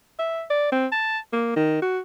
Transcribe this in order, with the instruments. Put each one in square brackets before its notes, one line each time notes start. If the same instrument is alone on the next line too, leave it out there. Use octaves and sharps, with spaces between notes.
[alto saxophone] E5
D5
C4
A5
A#3
D#3
F#4